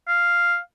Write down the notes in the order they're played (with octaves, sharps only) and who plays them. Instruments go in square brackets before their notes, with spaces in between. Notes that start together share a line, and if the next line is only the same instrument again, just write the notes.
[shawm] F5